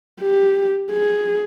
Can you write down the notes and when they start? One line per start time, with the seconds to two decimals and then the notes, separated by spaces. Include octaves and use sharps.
0.21 G4
0.91 G#4